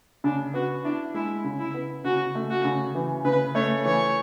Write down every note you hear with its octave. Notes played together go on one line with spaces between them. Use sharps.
C#3 D4
B3 F#4
D4 E4
G#3 E4
C#3
E4
B3
C#3 F#4
A3
F#4
C#3
E3
C#3 B4
A3 C#5
E3 C#5